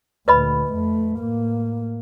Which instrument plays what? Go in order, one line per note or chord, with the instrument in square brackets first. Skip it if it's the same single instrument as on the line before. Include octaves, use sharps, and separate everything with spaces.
[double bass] D2 A#2 [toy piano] B4 D#5 B5
[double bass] F2 A3
A2 A#3